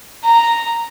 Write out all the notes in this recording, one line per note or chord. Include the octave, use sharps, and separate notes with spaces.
A#5